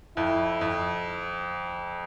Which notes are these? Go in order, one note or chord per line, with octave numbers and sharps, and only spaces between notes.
F2 E4
F2